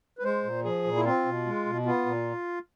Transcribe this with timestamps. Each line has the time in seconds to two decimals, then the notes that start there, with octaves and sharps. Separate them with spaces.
0.19 B4
0.23 G#3 C5
0.44 A#2
0.64 F3 G#4
0.84 A#2
0.96 E4
1.04 C4 F4
1.25 B2
1.46 G#3
1.66 B2
1.86 B3 F4
2.06 A#2